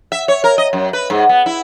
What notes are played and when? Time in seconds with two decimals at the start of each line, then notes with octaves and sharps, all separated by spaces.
0.12 E5
0.28 C#5
0.44 A#4
0.58 D#5
0.73 F#2
0.93 B4
1.10 G#2
1.29 B3
1.46 E4